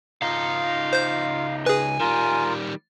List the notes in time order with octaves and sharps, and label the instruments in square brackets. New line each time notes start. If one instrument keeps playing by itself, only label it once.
[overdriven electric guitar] C#2 D#4 [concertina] F4 [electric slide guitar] F5
[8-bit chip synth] C5 G6
[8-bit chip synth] G#4 B4 [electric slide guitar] G#5
[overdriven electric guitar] D#3 G3 [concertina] F4 A#4